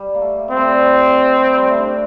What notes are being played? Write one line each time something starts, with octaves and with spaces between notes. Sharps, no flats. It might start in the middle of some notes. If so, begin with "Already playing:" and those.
Already playing: G3
A#3
A3
G3 C4
A3
G3
G3
G3
A3
D4
C4